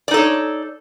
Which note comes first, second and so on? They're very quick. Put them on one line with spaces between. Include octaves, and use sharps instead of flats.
D5 D#4 A4 C#5